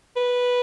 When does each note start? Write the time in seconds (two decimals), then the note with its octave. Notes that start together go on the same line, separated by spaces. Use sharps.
0.16 B4